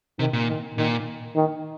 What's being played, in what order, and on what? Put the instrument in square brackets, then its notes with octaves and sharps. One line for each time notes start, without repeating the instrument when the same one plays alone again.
[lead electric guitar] C3 [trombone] D#3
[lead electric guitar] A#2
[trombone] D#3
[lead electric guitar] A#2 [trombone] D#3
[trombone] D#3